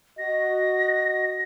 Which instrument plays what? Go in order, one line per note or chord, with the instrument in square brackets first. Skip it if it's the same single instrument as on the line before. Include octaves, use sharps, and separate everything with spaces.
[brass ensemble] F#4 D#5 [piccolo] A#6